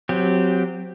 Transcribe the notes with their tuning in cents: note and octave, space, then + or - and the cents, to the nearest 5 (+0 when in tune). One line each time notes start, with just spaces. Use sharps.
F#3 -15 C4 -15 G4 +0